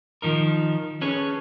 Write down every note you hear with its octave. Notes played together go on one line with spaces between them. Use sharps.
D#3 F3 D#4 A#4
C#4 G#4 A4 B4 C#5